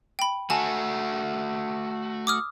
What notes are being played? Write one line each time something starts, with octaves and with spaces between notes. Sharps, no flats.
G5 B5
A3 F#4 G#5 A5
D6 D#6 F6